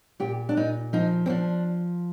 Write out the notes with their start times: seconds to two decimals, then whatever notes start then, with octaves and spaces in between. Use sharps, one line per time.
0.20 A#2 G4
0.49 D4
0.57 A#2 D#4
0.93 F3 D#4
1.26 C4
1.29 F3 D4